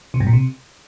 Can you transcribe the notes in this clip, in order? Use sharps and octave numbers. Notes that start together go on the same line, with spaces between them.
C3
G2
A#2
C3